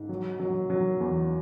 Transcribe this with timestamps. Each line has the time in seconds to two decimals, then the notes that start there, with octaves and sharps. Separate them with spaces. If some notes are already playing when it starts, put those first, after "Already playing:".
Already playing: G#2
0.09 F#3
0.40 F#3
0.70 F#3
1.00 E2